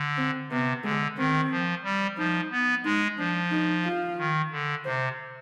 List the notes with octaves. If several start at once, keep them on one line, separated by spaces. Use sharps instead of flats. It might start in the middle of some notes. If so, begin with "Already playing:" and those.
Already playing: D3
C4
C3 B3
D3 G#3
D#3 C4
F3
G3
F3 D#4
B3
G#3 D#4
F3 D4
D#4
F4
D#3
D3
C3 C5